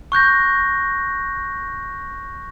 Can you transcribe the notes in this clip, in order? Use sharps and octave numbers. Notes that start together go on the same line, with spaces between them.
C#6 F#6 G6 A#6